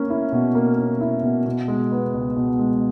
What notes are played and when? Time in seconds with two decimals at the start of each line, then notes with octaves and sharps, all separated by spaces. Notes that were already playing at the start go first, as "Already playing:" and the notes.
Already playing: A#3 C#4
0.10 E4
0.32 B2
0.55 A#3
0.78 C#4
1.01 E4
1.23 B2
1.46 B2
1.68 G#3
1.92 B3
2.14 C#2
2.36 B2
2.59 G#3